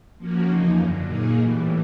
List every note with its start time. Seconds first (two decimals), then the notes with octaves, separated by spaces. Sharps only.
0.18 F3 A#3 C#4 F#4
0.46 E2 C#3 F3 A#3 D#4
0.76 F#2 D3 F#3
1.05 A#2 F#3 A#3 D#4 G#4
1.34 A2 E3 G3